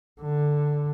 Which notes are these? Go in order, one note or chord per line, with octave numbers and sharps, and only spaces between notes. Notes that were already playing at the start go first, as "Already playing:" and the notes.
D3